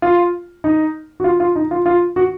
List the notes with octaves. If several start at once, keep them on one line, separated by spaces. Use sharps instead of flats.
F4
D#4
F#4
F4
F4
D#4
F4
F4
F#4